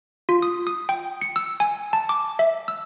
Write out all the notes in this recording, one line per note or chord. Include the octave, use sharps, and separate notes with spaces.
F4
D#6
D#6
G5
C#7
E6
G#5
A5
D6
E5
E6